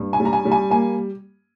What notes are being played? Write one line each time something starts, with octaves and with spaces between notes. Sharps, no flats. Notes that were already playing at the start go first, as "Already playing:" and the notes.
Already playing: G2
G#5
G3
A#5
G#5
G3
G#5
A#3 G#5